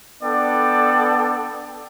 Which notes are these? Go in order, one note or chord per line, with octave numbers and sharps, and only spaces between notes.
B3 D4 A4 D5 G5